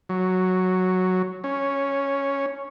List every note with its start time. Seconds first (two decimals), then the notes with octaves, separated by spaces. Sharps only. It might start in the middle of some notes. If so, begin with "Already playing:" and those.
0.09 F#3
1.44 C#4